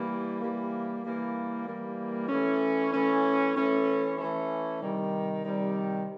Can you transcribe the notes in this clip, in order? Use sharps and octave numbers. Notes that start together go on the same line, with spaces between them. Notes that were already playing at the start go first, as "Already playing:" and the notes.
Already playing: E3 G3 A#3
E3 G3 A#3
E3 G3 A#3
E3 G3 A#3
E3 A3 C#4
E3 A3 C#4
E3 A3 C#4
E3 A3 C#4
C3 D#3 G3
C3 D#3 G3